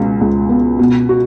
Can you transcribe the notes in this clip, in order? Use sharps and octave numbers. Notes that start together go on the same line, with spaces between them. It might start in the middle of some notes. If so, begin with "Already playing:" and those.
Already playing: C#2 B2 G#3 B3
C#2
B3
B2
F#4